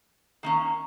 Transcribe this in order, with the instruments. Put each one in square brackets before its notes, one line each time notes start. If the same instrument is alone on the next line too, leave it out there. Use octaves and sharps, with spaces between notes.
[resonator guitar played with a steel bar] D#3 A#3 C#4